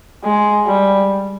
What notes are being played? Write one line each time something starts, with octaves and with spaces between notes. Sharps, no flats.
G#3
G3